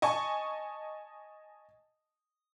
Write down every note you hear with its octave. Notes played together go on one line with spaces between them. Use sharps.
D#5 G#5 A5 C#6